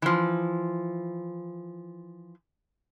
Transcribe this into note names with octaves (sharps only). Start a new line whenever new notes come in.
E3 F3